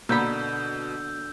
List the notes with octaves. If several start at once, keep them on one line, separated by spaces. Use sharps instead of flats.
B2 D3 A#3 B3 B5 E6 G6